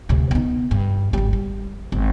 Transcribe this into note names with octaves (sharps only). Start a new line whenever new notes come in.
D2 C3
B3 D#4
G2
G#1 G3
G3
G#1